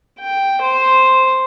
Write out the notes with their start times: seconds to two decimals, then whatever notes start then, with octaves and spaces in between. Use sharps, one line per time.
0.19 G5
0.61 C5